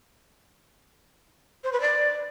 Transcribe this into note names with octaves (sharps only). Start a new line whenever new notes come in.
C5
B4
D5